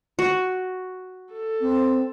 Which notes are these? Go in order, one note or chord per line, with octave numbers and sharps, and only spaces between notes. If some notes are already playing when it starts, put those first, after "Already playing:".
F#4
A4
C4